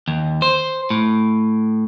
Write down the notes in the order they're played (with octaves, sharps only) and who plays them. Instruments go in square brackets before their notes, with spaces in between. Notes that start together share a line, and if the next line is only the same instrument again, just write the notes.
[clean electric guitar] D#2
C5
A2